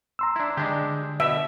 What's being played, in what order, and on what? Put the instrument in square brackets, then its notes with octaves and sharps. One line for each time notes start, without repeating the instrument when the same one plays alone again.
[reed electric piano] A#5 C6 E6
[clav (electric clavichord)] D4 E4
[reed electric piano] D3 [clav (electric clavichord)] G#3 D4 G4
[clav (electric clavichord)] B2 [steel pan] E5